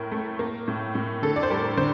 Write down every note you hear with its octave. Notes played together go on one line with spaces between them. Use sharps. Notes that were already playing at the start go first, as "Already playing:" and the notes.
Already playing: A2 A#4
A3
A#3
A2
A2
D3 A4
D5
C5
G3 A#4
D3 C5